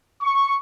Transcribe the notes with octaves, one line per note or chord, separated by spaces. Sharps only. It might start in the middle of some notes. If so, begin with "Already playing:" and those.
C#6